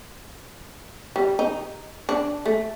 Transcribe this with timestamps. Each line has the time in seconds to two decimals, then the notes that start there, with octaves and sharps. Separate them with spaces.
1.16 G3
1.39 D#4
2.09 D4
2.46 A3